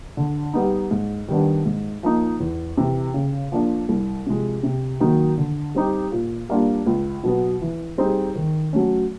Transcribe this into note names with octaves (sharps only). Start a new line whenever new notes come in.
D3
G3 B3 D#4
G#2
D#3 G3 B3 D4
G#2
F3 A#3 D#4
E2
C3 E3
C#3
F3 A#3 D4 F4
C2
C3 F3 G#3
C3
D#3 F#3 A#3 D#4
D3
G3 C4 D#4 G4
A#2
G3 A#3 D4 F4
C#2
B2 F#3 B3
E3
G3 C4 D#4 G#4
D#3
F#3 A3 C#4